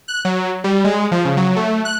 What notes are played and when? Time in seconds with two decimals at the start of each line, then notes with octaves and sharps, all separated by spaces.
0.08 F#6
0.25 F#3
0.64 G3
0.84 G#3
1.12 F3
1.25 C#3
1.37 F#3
1.56 A3
1.85 F#6